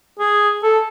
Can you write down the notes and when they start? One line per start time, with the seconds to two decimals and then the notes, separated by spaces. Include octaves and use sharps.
0.19 G#4
0.63 A4